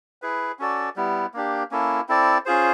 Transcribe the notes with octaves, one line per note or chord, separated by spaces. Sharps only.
E4 G#4 B4
C#4 F#4 A4 D5
G3 B3 E4
A#3 D4 G4
A#3 C#4 E4 A4
C4 E4 A4 D5
C#4 F4 G#4 C5